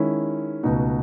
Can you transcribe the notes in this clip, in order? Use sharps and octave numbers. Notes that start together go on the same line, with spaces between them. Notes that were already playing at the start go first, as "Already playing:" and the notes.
Already playing: D#3 G#3 C#4 E4
C#2 B2 A3 D#4 F#4